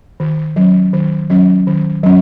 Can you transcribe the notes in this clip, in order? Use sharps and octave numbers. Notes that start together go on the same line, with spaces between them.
D#3
F#3 C#4
D#3
F#3 C#4
D#3
F#3 C#4